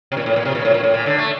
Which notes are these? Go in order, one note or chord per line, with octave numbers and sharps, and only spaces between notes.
C3
A#2
A2
A#2
C3
A#2
A2
A#2
A2
A#2
D3
A3